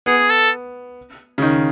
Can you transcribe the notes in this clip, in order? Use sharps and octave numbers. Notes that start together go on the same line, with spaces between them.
B3 G#4
A4
C#3
D#3